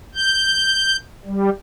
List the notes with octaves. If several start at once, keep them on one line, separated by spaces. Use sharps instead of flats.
G6
G3